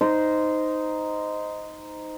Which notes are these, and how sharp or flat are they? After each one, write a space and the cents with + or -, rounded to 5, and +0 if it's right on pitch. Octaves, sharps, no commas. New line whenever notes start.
D#4 +0 C5 -15